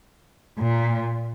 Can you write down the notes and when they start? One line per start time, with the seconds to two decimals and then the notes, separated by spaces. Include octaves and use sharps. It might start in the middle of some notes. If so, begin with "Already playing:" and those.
0.59 A#2